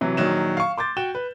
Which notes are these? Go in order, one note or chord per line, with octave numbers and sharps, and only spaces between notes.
C3 E3 F#3
A#1 D#3 F#3 E7
F5 C#6
C6 D6 G6 A6
F#4 G5 E7 G7
B4